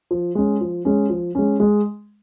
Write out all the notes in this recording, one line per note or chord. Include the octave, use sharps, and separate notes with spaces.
F3
G#3 C#4
F3
G#3 C#4
F3
G#3 C#4
G#3